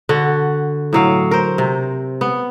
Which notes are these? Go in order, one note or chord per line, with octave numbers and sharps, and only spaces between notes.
D3 F#4
A2 F#3 F5
A#4 C5
C3
B3